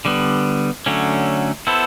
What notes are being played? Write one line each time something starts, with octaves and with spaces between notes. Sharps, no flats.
D3 G3 B3
D3 F#3 A3 C#4
B3 E4 A4 C5